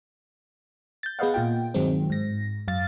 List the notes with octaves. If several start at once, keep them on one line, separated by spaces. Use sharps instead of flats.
G6 A6
B3 G#4 B4 D#5 F5 F#5
A#2 F4 G5
G2 D#3 F#3 G#3 C4
G#2 A#6
F#2 F5 A6